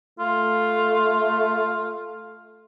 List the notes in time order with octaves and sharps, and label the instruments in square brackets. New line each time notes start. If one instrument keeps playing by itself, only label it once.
[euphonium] A3 [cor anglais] F4